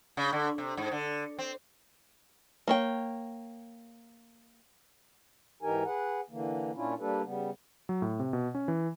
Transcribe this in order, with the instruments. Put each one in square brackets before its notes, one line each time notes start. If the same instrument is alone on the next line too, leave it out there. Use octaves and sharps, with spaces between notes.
[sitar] C#3
D3
C3
G#2
D3
C4
[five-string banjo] A#3 C#5 G5
[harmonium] G#2 E3 D#4 G4 A#4 G#5
G#4 B4 F#5
D3 E3 A#3
A#2 C#4 D4 E4 F4
G3 A#3 D4 G4 A4 B4
C#3 G3 B3
[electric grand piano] F#3
A2
C3
B2
C#4
E3